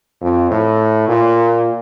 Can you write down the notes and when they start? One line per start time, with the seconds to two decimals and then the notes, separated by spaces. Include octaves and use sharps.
0.21 F2
0.51 A2
1.08 A#2